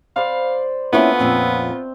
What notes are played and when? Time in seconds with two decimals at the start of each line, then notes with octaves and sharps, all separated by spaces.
0.16 C5 D5 F5 B5
0.93 D3 A#3 B3 C#4 E4 F4 E5 C#6
1.19 F2 A#2 C4 C#4